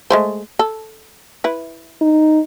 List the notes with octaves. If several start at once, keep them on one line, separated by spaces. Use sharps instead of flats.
G#3 A3 C5
A4
E4 B4
D#4